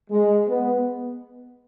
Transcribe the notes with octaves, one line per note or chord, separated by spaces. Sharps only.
G#3
B3